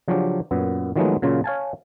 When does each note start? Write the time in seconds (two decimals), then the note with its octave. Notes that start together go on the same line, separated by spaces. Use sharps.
0.08 C#3 F3 F#3 C#4 D4 G4
0.51 F#2 A#2 B3
0.96 D#3 F3 F#3 G#3 A3 B3
1.22 A#2 C#3 F#3 C#4 F4
1.44 C#5 F5 G#5 A5